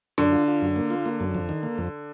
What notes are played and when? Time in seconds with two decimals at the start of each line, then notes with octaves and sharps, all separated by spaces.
0.18 F#2 D3
0.32 F4
0.48 F4
0.62 F#2
0.76 A#3
0.90 F4
1.06 A#3
1.20 F#2
1.35 F2
1.49 D#3
1.63 A#3
1.78 F2